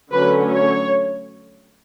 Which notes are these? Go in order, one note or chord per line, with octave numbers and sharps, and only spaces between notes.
D3 F#3 A3 C#4 B4
C#5